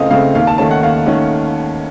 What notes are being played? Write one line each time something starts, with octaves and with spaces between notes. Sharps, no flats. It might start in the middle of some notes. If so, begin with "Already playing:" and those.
Already playing: C#2 C#3 A3 C4 D#5 F5
C#3 A3 C4 F5
D#2 F5
A5
D#3 A3 C#4 A5
F#5
D#2 F5
D#3 A3 C#4